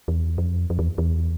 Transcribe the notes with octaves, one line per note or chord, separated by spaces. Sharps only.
E2
F2
F2
E2
E2